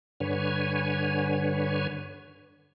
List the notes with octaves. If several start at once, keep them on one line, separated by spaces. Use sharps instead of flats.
G2 D3 B4 C#5 G#5